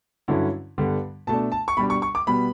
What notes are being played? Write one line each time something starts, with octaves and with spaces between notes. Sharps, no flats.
G2 D3 F#3 C#4 E4
G2 D3 G3 B3
B2 A3 D4 A5
A5
C#6
B2 G3 D4 B5
C#6
C#6
D6
B2 G3 B3 B5